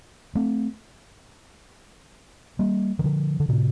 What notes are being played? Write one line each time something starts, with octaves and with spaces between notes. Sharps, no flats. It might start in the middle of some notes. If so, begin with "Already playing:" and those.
A3 C4
G3 A#3
D#3
D3 F3
D3
A2 C3